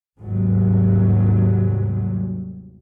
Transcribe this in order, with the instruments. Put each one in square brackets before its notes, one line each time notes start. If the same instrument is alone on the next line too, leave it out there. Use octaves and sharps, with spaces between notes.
[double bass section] G1 D#2 G#2 C3 F#3 G3